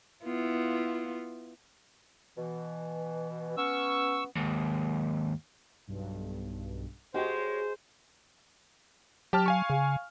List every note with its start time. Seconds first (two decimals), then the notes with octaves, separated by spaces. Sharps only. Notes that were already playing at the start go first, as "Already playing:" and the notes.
0.24 B3 E4 F4
2.37 B2 E3
3.57 B3 C#4 C#6 E6
4.36 D#2 G#2
5.87 B1 G2
7.14 G#3 F#4 G4 C5 C#5 G5
9.33 F#3 G4 A5 F6
9.46 F5 G#5 C#6
9.70 C#3